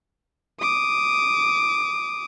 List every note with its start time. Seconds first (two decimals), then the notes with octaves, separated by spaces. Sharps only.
0.61 D6 D#6